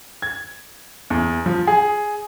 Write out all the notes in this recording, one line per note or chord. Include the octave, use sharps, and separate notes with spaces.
G#6
E2
F3
G#4